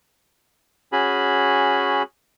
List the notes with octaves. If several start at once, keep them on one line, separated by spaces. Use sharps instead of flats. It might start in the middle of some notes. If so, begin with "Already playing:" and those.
C#4 F#4 G#4 B5